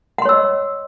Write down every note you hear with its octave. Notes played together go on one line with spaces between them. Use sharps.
C#5 D#5 F#5 C6 E6